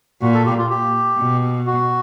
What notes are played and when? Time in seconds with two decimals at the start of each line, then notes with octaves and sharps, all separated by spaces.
0.21 A#2 F#4
0.34 A4
0.46 G4
0.58 F4
0.70 G4
1.18 B2
1.66 F#4